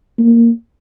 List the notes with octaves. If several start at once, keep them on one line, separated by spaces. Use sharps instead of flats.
A#3